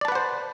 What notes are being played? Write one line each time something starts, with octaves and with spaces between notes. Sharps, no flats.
B4 C5 D5 F#5 A5